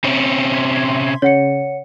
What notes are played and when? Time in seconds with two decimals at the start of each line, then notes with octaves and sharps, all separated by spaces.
0.04 C3 C4 C#4
0.54 C6 G#6 B6
1.22 C#3 C#5 F#5 C#7